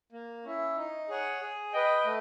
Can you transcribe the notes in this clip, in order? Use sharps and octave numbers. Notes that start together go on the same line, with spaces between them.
A#3
C#4 E4
D#4
G#4 C#5 F#5
G#4
B4 D#5 G5
A3